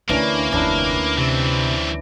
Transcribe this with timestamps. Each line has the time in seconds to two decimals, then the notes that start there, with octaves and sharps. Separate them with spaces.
0.09 D2 E3 A#3 C#4 D4
0.52 F1 D2 A3 C#4 D4 E4
1.18 C3 E3 C4